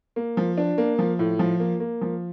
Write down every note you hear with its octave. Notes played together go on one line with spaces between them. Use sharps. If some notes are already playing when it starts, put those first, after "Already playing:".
A#3
F3
D4
A#3
F3
A2
F3
A#3
A#3
F3